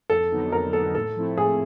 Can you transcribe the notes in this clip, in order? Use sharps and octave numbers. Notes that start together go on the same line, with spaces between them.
F2 A4
D3 F#3 B3 D#4
F2 A#4
D3 F#3 B3 D#4 A4
A2 A4
F3 A3 C4 E4
A2 G#4